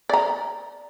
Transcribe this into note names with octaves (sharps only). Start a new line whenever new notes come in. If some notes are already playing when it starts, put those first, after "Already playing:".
D5 A#5